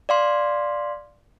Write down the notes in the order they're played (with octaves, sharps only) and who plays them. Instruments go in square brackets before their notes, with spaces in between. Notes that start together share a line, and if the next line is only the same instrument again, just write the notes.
[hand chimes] D5 F5 C6